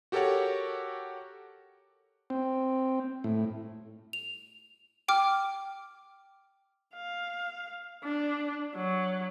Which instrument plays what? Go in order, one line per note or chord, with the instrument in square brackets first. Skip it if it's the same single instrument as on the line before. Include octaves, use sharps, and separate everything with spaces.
[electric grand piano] F#4 G4 A4 A#4 C#5 F#5
[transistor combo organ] C4
A2
[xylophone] F7
G5 D6 F6
[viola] F5
D4
F#3